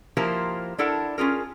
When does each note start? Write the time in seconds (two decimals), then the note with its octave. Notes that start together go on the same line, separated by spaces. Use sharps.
0.17 F3 A#3 E4 G4 A#4 C5
0.78 D4 E4 A4 A#4 F#5
1.18 C#4 F4 G#4 A#4